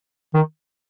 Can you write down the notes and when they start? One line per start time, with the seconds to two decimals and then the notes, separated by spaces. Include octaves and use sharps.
0.34 D#3